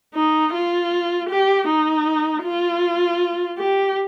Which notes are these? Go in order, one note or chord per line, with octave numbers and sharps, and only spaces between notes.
D#4
F4
G4
D#4
F4
G4